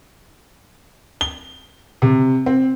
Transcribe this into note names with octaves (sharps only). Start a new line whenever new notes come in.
G7
C3
C4